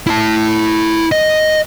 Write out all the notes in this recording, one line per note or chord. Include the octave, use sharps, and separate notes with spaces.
E4 A5
D#5